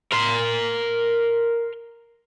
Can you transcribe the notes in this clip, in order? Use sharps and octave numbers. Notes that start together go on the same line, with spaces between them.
A#4 C6